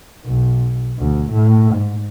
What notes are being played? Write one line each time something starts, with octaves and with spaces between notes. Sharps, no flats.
B1
D2
A2
G#2